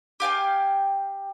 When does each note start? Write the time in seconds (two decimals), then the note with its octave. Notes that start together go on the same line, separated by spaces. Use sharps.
0.20 G4 F5 G5 G#5